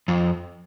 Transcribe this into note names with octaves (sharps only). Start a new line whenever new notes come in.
F2